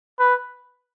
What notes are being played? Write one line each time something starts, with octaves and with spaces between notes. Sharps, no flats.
B4